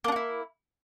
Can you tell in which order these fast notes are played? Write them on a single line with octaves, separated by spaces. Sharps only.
A#3 D4 F#4 E4